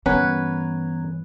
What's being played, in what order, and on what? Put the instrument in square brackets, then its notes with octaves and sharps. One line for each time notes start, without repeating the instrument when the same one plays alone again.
[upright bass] G2 E3 [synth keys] B3 A#5 G#6 [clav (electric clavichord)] C#4 F#5 [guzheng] B4